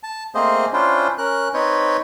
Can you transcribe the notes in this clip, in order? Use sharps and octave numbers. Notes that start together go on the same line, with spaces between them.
A5
A3 A#3 C4 G#4 C5 D#5
C#4 D4 E4 F4 C5 G5
C#4 A#4 F#6
C4 D#4 B4 C#5 G5